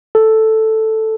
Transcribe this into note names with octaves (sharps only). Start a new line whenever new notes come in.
A4